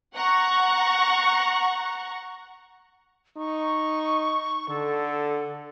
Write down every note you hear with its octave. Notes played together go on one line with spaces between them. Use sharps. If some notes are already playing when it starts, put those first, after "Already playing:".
F#5 A#5 C#6
D#4 C#6
D3 A4